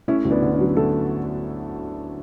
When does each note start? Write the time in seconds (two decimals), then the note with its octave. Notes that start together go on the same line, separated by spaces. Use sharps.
0.08 A3 C#4 E4
0.25 D2
0.31 B3 D4
0.42 D3
0.54 C#4
0.60 F#3
0.77 A3 F#4 A4